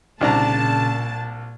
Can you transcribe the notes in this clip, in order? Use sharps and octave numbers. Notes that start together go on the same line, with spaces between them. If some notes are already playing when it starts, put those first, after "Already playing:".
C2 A#2 C#3 D4 A5 A#5